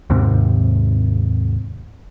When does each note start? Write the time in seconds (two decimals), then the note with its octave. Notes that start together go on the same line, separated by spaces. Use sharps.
0.10 D#2 G#2 C3